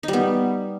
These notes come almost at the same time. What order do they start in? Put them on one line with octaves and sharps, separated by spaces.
D#4 G3 B3